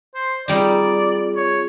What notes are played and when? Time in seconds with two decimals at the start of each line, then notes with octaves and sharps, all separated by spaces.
0.15 C5
0.48 G3 C4 D#4 F4 G#4 D5
1.36 C#5